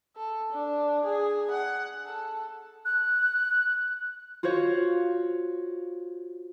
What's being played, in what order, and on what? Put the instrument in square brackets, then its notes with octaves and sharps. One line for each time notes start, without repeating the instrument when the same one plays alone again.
[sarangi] A4
D4
G#4
F#5
A4
[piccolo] F#6
[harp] F4 F#4 C5 C#5 F5